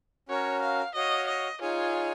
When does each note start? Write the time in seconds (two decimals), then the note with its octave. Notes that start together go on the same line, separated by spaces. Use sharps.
0.29 C#4 F#4 A#4 C#5
0.62 F5
0.95 F#4 C#5 D#5 F5
1.28 D#5
1.61 D#4 F4 G#4 C#5 G#5